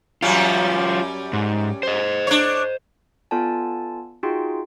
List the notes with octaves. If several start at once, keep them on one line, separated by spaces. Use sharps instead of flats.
F#2 F#3 G3 C#4 F4
G#2
C5 D#5
D4 C#5
B3 F4 A4 D5 G#5 A5
D#4 F4 F#4 G#4 G5 C6